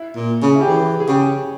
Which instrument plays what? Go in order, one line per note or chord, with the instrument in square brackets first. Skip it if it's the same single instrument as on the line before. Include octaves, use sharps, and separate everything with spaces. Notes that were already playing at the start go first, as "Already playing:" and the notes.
Already playing: [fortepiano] E4
[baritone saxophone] A#2
C#3
[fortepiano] E4
G4
[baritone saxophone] E3 [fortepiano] G#4
[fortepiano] G#4
[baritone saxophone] C#3 [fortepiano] G4